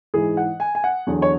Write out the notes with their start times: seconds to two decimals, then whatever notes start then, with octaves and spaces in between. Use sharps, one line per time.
0.14 G#2 E3 G#4
0.37 F#5
0.60 G#5
0.75 G#5
0.84 F#5
1.07 E2 D3 F#3
1.22 C#5